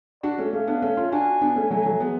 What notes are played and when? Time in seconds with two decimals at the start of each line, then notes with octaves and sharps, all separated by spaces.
0.23 D4 F#4 D5
0.38 A3 C#4
0.53 A3 C#4 F5
0.67 B3 D4
0.82 A3 C#4
0.97 C#4 F4
1.12 D4 F#4 G#5
1.41 B3 D4
1.56 A3 C#4
1.71 F#3 A3 G#5
1.86 F#3 A3
2.00 G#3 B3